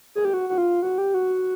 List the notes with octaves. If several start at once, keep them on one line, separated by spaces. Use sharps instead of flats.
G#4
G4
F#4
F#4
F4
F#4
G4
F#4